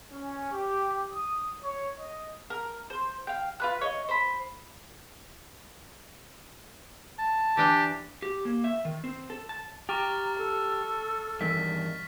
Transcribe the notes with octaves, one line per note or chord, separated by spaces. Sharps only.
C#4
G4
D#6
C#5
D#5
A#4
C5
F5 G5
F4 B4 F#6
C#5 D#5
C5 B5
A5
E3 D4 G4 G5
G4
A#3
E5
D#3
C4
A4
A5
G4 A#5 C#6 F6 A6
A4
E2 G2 D#3 B6